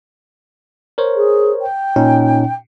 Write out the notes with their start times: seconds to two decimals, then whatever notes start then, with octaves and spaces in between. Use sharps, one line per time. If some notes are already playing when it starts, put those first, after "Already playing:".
0.98 A#4 C5 C#5
1.15 G#4
1.61 G5
1.96 A#2 C#4 D#4